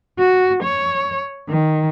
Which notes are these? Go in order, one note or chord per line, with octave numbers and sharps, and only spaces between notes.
F#4
C#5
D#3